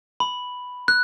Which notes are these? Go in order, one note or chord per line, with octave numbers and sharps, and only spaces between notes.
B5
F#6